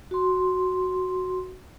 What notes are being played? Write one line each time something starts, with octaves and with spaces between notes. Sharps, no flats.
F#4 C6